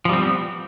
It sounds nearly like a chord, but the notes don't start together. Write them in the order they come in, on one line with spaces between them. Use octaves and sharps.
F3 G3 C4 B3